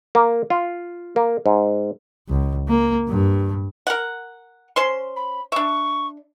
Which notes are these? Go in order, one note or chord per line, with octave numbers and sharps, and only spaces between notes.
A#3
F4
A#3
G#2
C#2
A#3
G2
A#4 F#5
C#4 C5 C6
B5
D4 E5 C#6